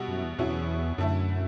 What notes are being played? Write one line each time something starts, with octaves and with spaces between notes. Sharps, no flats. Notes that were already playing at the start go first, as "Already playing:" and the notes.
Already playing: B2 G3 B3 E4
F#2
E2
E2 B2 F#3 C#4 E4
F#2 D3 A3 E4